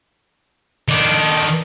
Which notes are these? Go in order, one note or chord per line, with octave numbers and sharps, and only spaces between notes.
D#3 D4